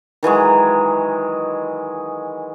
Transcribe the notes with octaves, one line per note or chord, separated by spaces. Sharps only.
D#3 E3 F#3 G#3